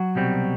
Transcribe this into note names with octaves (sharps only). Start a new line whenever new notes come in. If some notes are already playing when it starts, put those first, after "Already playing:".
Already playing: F#3 F#4
C2 B2 G3 C4